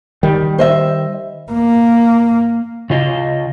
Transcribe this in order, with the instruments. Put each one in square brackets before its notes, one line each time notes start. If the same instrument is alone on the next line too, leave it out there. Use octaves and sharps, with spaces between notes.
[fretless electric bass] D#3 G3
[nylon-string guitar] C5 D#5 E5
[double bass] A#3
[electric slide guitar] C#3 F4 D#5